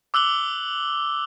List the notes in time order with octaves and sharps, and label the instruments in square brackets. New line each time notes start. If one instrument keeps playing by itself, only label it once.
[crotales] D6 E6 F#6 F#7 G7